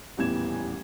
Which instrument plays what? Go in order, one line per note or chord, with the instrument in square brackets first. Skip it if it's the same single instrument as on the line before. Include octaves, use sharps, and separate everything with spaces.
[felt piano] D#1 A1 E2 E3 G#6 E7